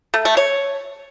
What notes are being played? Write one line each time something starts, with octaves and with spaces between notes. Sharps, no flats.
A3
A3
C#5